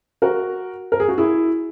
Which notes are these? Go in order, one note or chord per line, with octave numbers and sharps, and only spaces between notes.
F#4 A#4
A#4
G#4
F#4
E4 G#4